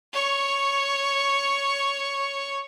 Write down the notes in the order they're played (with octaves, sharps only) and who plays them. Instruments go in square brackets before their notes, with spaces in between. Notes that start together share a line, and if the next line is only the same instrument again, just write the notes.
[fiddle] C#5 C#6